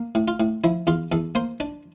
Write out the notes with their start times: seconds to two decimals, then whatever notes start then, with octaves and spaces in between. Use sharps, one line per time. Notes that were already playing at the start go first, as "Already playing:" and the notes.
Already playing: A#3
0.15 A2
0.28 F4
0.40 A2
0.64 F3 E4
0.87 E2 F4
1.12 E2 A4
1.35 A#3 C5
1.60 D4 D5